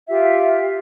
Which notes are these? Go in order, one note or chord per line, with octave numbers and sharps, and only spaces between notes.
F4 G4 E5